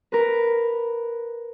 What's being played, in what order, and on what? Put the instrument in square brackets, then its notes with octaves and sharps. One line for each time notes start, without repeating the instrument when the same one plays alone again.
[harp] A#4 B4